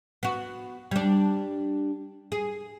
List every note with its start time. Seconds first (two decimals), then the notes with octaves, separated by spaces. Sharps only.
0.23 B3 F#4
0.91 G3 D4
2.32 G#4